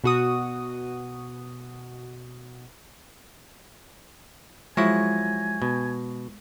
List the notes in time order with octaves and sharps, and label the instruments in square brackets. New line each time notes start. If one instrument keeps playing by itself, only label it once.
[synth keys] B2 F#4 D#6
[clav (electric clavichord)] F3 F#3 E4 [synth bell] G#3 C#6 A#6 [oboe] G#5
[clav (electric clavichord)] B2